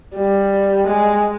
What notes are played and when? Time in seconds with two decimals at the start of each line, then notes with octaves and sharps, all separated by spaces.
0.16 G3
0.87 G#3